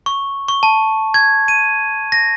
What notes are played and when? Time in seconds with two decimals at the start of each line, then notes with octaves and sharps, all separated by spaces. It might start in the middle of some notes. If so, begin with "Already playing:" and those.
0.06 C#6
0.48 C#6
0.63 A5
1.14 G#6
1.48 D#7
2.12 A#6